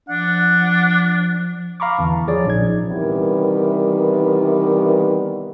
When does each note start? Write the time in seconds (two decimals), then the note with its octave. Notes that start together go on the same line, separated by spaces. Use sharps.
0.09 F3 D4 F#5
1.80 F5 A#5 B5 C#6 D6
1.98 E2 D3 E3 A5
2.27 F3 G#4 C#5 D5
2.46 A#1 C#4 D#4 G#6
2.87 C3 D#3 E3 G3 B3 A#4